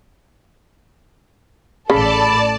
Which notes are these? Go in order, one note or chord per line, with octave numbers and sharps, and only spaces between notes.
A1 C#3 A4 D5 A5 B5